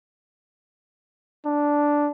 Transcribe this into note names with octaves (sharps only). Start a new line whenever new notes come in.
D4